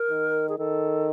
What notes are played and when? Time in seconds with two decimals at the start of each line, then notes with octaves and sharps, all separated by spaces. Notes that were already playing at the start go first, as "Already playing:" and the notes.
Already playing: A#4
0.10 D#3
0.49 G#4
0.58 D#3 A4